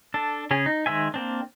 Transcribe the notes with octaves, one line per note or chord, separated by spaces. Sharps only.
D4 A4
C#3 C#4 G#4
D#4
D#3 G#3 C5 E5 G#5
A#3 C4 D4